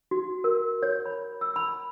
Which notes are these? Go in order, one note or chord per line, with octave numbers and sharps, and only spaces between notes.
F#4
A#4
C#5
B5
E6
B5